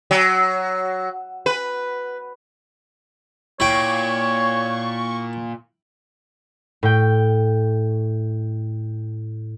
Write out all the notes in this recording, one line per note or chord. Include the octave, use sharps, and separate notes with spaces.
F#3
B4
A#2 E4 C#5 G5 C#6
A2 G5